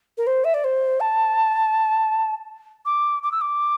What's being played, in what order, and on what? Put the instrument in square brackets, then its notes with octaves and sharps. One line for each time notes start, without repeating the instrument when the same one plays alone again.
[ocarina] A#4
C5
E5
D5
C5
A5
D6
D6
E6
D6